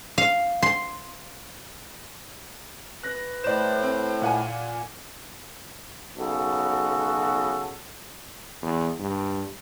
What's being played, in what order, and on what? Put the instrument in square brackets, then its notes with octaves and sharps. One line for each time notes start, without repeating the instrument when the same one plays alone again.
[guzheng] F5
C6
[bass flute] B4 [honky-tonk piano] F#6 A#6
[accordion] A2 [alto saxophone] C5 [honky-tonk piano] D5 E7
[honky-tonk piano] C4
A#2 F#5 G#5
[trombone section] B1 C#3 F#4 A4
[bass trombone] E2
G2